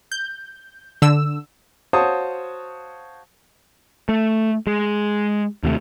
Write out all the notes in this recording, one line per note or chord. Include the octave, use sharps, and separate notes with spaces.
G6
D3 E6
F#4 C5 C#5 F5 A5 D#6
A3
G#3
D#2 C3 F#3 A3